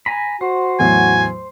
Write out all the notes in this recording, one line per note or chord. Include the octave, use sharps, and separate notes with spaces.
G#5 A#5 B5
F#4 C5
E2 A2 F#3 G#5